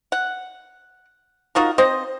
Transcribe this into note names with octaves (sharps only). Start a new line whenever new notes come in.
F#5
D#4 F4 F#4 A#4
C4 C5 D#5